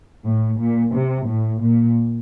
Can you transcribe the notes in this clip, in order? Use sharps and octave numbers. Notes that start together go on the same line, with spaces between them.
A2
A#2
C3
A2
A#2